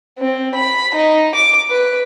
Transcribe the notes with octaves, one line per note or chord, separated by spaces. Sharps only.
C4
B5
D#4
D6
B4